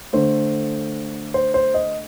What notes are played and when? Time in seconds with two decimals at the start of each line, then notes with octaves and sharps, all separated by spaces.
0.13 D3 A3 C5
1.34 C5
1.54 C5
1.74 D#5